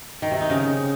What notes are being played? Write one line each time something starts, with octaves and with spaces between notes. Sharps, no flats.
D#3
C3
D#4
C#3